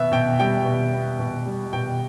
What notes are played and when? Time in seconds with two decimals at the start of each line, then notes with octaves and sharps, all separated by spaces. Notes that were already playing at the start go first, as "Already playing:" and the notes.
Already playing: B2 B3 E5
0.12 B2 G5
0.39 G3 G5
0.65 B2
0.93 B3
1.19 B2
1.46 G3
1.73 B2 G5